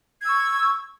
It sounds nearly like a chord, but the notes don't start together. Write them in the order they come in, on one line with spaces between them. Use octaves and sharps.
G#6 E6 C#6